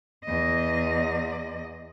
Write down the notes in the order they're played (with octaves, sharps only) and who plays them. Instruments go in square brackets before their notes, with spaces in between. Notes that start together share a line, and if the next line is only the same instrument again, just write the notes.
[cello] E2 D#5